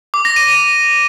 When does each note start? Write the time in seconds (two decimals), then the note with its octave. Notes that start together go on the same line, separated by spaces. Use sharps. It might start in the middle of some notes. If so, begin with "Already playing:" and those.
0.14 D6
0.25 A#6
0.36 D#7